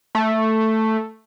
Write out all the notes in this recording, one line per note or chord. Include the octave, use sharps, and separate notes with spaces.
A3